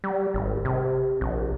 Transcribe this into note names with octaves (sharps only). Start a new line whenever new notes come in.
G3
G#1
C3
A#1